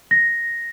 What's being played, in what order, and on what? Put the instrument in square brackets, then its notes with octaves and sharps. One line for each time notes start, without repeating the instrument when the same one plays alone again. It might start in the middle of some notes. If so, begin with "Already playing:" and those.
[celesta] A#6